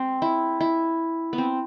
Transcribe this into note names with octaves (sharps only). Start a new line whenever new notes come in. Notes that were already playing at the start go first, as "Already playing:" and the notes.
Already playing: G#3 C4
E4
E4
B3
C4